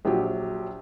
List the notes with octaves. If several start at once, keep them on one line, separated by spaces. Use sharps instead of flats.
A#1 F#3 G4